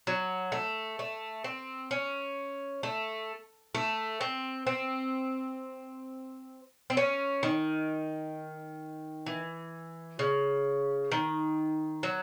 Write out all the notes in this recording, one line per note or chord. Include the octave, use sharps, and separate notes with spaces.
F#3
A3
A3
C4
C#4
A3
A3
C4
C4
C4
C#4
D#3
E3
C#3
D#3
F#3